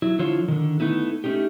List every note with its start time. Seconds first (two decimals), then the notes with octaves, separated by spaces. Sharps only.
0.02 F#3 E4
0.19 D3 F3 E4 F4 C#5 F5
0.48 D3 D#3
0.80 A3 B3 D#4 E4
1.24 A3 C#4 D#4 G4